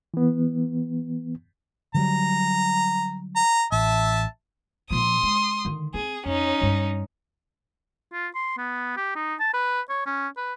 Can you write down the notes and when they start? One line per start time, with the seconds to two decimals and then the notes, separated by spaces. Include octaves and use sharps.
0.14 E3 B3
1.94 D3 F#3 G3 A#5
3.36 A#5
3.72 A1 E5 A5
4.91 A#2 F3 C6 D#6
5.23 G#3
5.65 D3 D#3
5.94 C4 G#4
6.26 F2 C#4 D#4
6.62 G2 G3
8.12 F4
8.35 C6
8.57 B3
8.97 G4
9.15 D#4
9.40 A5
9.54 B4
9.89 C#5
10.06 C#4
10.37 B4